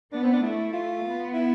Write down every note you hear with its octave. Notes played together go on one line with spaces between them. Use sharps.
B3 D4
C4
D4
A3 E4
F4
B3
E4